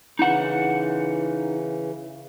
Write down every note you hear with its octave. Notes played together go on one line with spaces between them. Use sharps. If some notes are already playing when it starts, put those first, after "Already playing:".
C#3 E3 D#4 F#5